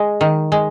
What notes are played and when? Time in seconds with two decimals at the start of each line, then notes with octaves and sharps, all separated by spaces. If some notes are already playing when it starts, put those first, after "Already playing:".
Already playing: G#3
0.21 D#3
0.52 G#3